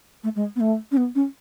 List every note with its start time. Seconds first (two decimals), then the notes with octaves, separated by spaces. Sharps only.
0.24 A3
0.36 G#3
0.56 B3
0.60 A3
0.92 C#4
0.97 B3
1.15 C#4